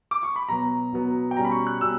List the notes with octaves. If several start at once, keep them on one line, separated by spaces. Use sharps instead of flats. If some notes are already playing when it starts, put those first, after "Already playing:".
D6
C#6
B5
B2 F#3 B3 A#5
B2 F#3 B3
G5
B2 G3 C#4 A#5
B5
C#6
F#6
B2 G3 C#4 E6